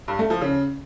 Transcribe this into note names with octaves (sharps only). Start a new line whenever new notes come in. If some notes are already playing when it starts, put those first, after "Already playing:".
G2
A3
F3
C#3